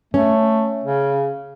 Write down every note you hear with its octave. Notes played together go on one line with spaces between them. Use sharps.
A3 C#4
C#3